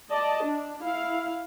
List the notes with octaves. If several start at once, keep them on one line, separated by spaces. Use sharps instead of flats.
D5 D#5 A5
D4
E4 F5